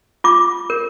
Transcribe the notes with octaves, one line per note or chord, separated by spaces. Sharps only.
F4 D6
A#4